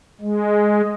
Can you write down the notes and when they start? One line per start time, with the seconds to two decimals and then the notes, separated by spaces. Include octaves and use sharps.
0.21 G#3